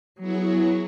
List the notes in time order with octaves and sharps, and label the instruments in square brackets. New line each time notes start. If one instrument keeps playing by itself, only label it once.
[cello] F#3 [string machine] B3 E4 G#4 C#5